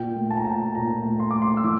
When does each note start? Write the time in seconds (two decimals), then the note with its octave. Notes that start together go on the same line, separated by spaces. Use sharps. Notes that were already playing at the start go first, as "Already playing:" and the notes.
Already playing: A#2 G5
0.16 A3
0.31 A5
0.37 A#5
0.45 A#2 A5
0.75 A#2 A#5
1.05 A3
1.20 C6
1.31 A3 D6
1.42 C6
1.57 E6
1.63 E3 D6